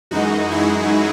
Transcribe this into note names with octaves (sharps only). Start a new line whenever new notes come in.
F#2 E3 G#3 D#4 F#4
E4 G#4